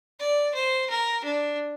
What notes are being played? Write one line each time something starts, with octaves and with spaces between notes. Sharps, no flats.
D5
C5
A#4
D4